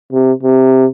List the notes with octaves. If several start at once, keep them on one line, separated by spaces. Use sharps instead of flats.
C3
C3